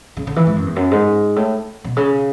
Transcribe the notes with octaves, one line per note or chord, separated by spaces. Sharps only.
C#3
D3
E3
G#2
F#2
E2
F#2
G#2
A2
B2
C#3